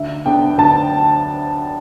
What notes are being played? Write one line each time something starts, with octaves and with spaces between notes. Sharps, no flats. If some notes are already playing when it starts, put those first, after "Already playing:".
Already playing: D2 E5
D3 B3 D4 G5
D2 A5